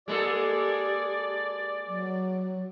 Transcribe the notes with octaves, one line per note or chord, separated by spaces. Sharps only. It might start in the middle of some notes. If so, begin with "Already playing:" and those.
G#3 A#3 G4 A4 D5
F#3